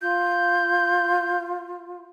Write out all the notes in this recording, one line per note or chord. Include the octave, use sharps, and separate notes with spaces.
F4 G6